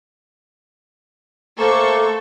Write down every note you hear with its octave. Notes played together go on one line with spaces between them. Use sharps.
A3 A#3 A4 C5 C#6